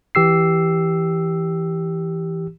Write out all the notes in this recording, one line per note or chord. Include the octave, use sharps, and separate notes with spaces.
E3 G4 E6 C7